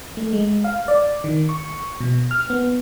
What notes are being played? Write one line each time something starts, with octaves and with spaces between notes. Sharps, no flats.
A3
G#3
F5
D5
D#3
C#6
B2
F6
B3